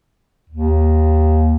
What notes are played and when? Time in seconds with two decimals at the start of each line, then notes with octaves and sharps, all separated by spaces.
0.50 D#2